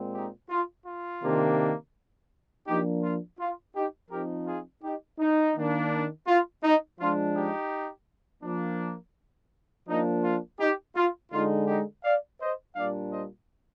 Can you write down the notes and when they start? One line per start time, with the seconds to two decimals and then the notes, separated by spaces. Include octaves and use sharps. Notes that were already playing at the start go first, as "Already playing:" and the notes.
Already playing: A#2 G#3 C4
0.14 D#4 G4
0.50 F4
0.86 F4
1.23 C3 D#3 A#3 D4
2.67 F3 A#3 D4 D#4 G4
3.02 F4
3.39 F4
3.74 D#4 G4
4.10 F3 C4 D#4 G4 A#4
4.46 F4 G#4
4.82 D#4 G4
5.19 D#4
5.56 D#3 A#3 D4
6.27 F4
6.63 D#4
7.00 F3 G#3 D4 F4
7.35 D#4 G4
8.43 F3 A#3 D4
9.87 F3 A#3 D4 D#4
10.24 F4
10.59 D#4 G4
10.96 F4
11.32 D3 G#3 D#4 F4
11.67 D#4 G4
12.04 D5 F5
12.40 C5 D#5
12.75 A#2 G3 D4 D5 F5
13.12 C5 D#5